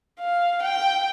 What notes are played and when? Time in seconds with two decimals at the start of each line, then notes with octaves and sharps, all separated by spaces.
0.20 F5
0.63 G5